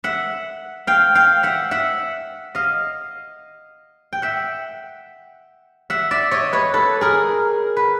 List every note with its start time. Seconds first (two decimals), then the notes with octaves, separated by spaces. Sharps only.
0.04 E5 F#5
0.87 F5 G5
1.15 F5 G5
1.43 E5 F#5
1.71 E5 F#5
2.55 D#5 F5
4.13 G5
4.22 E5 F#5
5.90 E5 F#5
6.11 D5 E5
6.31 C#5 D#5
6.53 B4 C#5
6.74 A4 B4
7.01 G#4 A#4
7.77 B4